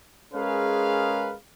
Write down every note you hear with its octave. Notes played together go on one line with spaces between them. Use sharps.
G#3 C#4 G#4 A#4 B4 F5